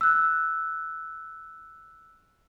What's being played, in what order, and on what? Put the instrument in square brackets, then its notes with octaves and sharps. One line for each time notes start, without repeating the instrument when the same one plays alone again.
[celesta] E6 F#6